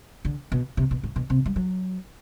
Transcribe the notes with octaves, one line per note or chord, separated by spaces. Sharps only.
D3
B2
C3
B2
A2
B2
C3
G3
F#3